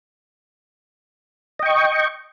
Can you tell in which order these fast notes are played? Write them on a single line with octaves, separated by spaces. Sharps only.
D#5 G5 C#6